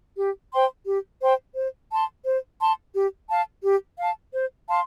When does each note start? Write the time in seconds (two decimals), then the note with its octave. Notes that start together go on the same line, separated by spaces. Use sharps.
0.17 G4
0.51 C5 G5 C6
0.85 G4
1.21 C5 G5 C6
1.55 C5
1.91 A5 C6
2.25 C5
2.59 A5 C6
2.94 G4
3.28 F5 A5
3.63 G4
3.97 F5 A5
4.32 C5
4.67 F5 A5 C6